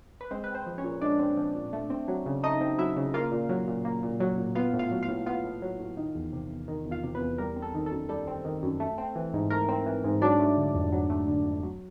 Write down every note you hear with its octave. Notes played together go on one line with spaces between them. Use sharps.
B4
G#3 C4 C5
C4 B4
C4 C5
F3
C#4 C#5
A#2
G#3 D4 D5
C4
F3
A#2
A3
C4
F#3
C#3
A3 D#4 D#5
C4
F#3 E4 E5
C#3
A#3 F4 F5
A#2
F#3
A#2
A#3
A#2
F#3
A#2
B3 F4 F5
A2
F4 F5
F#3
F4 F5
A2
B3 F4 F5
A2
F#3
A2
D#3
E2
C3
E2
D#3
E2
F4 F5
C3
B3 B4
E2
G3 A#4
C4
A4
D#3
A4
F#2
G3 A4
C4
D#3
F#2
A3
C4
E3
G#2
A3 A#4
C4
E3
G#2
F#3 D4 D5
A3
D3
F2
F#3
A3
D3
F2
F#3